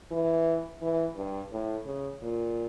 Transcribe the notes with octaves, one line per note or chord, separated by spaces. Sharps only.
E3
E3
G2
A2
C#3
A#2